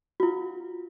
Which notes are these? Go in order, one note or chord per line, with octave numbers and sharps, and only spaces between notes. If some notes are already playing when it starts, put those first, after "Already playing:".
F4 F#4